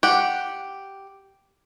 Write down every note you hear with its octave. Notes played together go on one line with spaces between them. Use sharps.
G4 F#5